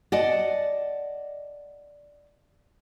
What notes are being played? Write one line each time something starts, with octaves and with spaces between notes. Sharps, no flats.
D5 D#5 F#5 A5